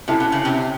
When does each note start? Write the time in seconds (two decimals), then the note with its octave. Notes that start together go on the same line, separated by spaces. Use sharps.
0.08 C3 C#4 E4 A4
0.20 B2
0.32 C#3
0.45 C3